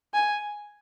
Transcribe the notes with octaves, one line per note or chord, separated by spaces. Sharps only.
G#5